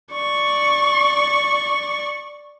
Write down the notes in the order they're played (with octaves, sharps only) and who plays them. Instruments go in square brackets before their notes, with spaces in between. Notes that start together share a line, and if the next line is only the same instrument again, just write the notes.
[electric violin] D5 C#6